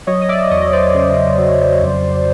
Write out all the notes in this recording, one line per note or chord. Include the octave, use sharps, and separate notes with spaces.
F#3 C#5 D#5
D#5
D5 E5
E2 C#5 D#5
C5 D5
C#3
F#3
F2